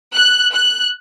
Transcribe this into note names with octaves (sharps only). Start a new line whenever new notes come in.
F#6
F#6